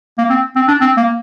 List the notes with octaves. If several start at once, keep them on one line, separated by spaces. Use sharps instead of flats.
A#3
C4
C4
D4
C4
A#3